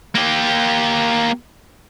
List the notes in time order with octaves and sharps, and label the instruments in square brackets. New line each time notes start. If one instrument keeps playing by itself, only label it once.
[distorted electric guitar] A#3 G4